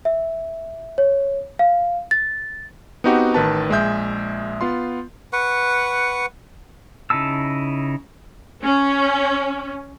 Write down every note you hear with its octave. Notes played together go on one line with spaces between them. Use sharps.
E5
C#5
F5
A6
B3 C4 D#4 F#4 G4 F#5
A1 D#3 B4 A5
A#1 G#3 G#4 E5 G6
B3 F4 C6
B4 F#5 C#6
C#3 D#4 E4 A5 E6
C#4